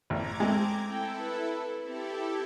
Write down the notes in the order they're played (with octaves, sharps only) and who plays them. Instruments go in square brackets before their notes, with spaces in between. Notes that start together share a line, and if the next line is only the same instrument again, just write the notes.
[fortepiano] A1 [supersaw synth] A#5 D6 G#6
[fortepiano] G#3 A3 [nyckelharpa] C4
[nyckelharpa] C4 G5 [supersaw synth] E4 A4
[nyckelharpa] B4
[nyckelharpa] C4 [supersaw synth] E4 G4 A4